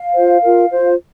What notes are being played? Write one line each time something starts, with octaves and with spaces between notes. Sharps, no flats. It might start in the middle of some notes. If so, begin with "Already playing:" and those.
Already playing: F5
F4 C5
F4 A#4
F4 C5